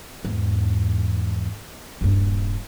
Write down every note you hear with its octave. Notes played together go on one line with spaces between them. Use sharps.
E2 G#2
D#1 G2